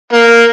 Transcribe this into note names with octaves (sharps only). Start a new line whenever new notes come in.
A#3